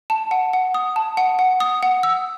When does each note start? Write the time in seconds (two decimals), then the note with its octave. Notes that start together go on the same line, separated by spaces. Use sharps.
0.10 A5
0.31 F#5
0.53 F#5
0.74 D#6
0.96 A5
1.17 F#5
1.39 F#5
1.60 D#6
1.83 F#5
2.03 E6